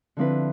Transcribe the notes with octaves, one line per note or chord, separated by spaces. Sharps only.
D3 F3 C4 E4 B4